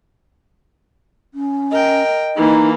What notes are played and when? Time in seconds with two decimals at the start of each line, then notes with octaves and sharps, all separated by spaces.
1.34 C#4
1.72 A#4 D#5 G5
2.36 E3 A#3 D#4